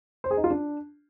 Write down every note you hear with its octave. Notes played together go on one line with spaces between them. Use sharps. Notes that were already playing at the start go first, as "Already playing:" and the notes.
C5
G#4
D#4
F4
D4